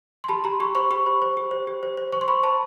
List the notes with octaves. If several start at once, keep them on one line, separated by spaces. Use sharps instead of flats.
C6
G4 A5 B5
G4 A#5 C6
G4 B5 C#6
C5 B5 C#6
G4 B5 C#6
C5
C5
G4
C5
G4
C5
C5
C5 C#6
C6
C5 B5 C#6
C5 A5 B5